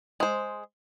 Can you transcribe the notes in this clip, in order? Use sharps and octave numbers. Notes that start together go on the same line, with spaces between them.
G#3 C5